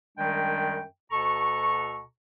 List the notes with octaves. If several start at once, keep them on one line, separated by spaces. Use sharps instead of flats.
F#2 D#3 G3 G#3 D4 G5
D2 B2 A4 A#5 C#6